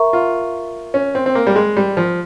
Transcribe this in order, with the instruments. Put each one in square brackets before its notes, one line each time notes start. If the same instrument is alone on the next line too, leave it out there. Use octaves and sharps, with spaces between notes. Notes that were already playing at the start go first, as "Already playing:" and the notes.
Already playing: [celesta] A#4 E5 A#5 C#6
[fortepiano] F4
C#4
C4
C4
A#3
G3
G#3
G3
F3